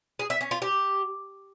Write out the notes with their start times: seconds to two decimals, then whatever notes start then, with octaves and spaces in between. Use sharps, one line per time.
0.19 G#4
0.30 E5
0.41 C#4
0.51 F4
0.62 G4